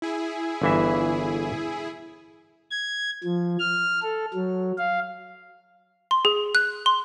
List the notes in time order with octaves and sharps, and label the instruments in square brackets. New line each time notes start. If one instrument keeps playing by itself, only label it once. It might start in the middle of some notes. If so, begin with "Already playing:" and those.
[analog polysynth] E4 G#4
[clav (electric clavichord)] G1 E3 E5
[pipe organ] G#6
F3
F6
A4
F#3
F5
[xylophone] C6
G#4
F#6
C6